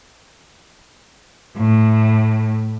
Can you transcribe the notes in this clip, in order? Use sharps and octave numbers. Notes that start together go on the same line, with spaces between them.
A2